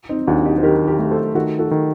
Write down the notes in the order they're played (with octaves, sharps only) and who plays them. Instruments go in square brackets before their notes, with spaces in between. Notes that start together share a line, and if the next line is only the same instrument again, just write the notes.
[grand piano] C4 D#4
[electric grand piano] D#2 [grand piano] D4 F#4
[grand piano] D#4 G4
C5
[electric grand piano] D#3 [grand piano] G4 A#4
[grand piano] G4 A#4
[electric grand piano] A3
[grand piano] A4 C5
[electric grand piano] D#3 [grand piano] F#4 A4
[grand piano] F#4 A4
[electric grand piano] D#3